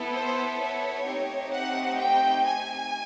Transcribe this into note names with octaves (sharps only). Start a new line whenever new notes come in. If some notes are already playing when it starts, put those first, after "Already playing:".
Already playing: B3 E4 A4
C5
C#5
A3 C4 D#4 G4
F#5
G5
G#5